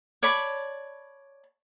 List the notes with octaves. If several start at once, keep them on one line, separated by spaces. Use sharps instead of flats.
C#5 D5 A5 B5